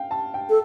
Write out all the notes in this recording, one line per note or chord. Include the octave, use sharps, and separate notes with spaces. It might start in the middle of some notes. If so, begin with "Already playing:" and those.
Already playing: F5 G5
A5
G5
A4